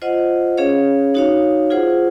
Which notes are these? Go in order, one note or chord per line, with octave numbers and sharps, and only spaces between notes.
F4 C5 D#5 F#5
C#4 G#4 C#5 F5
D#4 F#4 C#5 F5
F4 G#4 C5 F#5